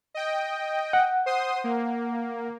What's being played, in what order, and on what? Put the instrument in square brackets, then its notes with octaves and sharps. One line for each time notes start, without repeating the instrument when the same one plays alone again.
[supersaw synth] D#5 G5
[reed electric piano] F#5
[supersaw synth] C5 C6 D#6
A#3